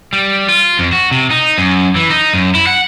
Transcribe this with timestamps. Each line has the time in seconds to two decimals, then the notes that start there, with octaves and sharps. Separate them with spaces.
0.13 G3
0.49 F4
0.79 F2
0.92 F#4
1.11 C3
1.31 D#4
1.58 F#2
1.96 E3
2.10 D#4
2.33 F#2
2.55 E4
2.67 F#5